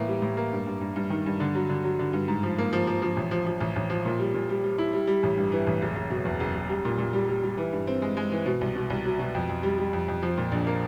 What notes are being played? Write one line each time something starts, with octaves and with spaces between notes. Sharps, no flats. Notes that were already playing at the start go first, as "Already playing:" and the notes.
Already playing: A2 E3 A#3
G3
A2
A#3
G2
G2
G2
G2
D#3
G2
D3
F#3
D3
F#3
D3
G2
G#2
F3
A#3
F3
F3
F3
A1
F3
F3
A1
A1
F3
A#2
G3
A#2
G3
G3
E4
G3
G3
A1
G2
E3
A1
F#1
F#1
B2
E2
F#1
F#1
G3
A#2
A#2
G3
G3
G3
E3
G2
C4
G#3
G#3
E3
B2
C2
B2
C2
F#3
B2
F2
F2
G3
G3
F2
F2
F3
A#2
A#1
A#3